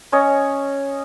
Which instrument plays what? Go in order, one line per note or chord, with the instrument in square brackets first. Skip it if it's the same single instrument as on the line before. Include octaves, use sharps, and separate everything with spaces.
[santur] C#4 C#5 D#5